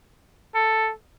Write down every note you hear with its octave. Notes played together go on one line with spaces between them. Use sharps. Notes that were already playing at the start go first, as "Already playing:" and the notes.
A4